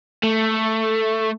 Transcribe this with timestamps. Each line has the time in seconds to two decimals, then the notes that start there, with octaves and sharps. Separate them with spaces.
0.23 A3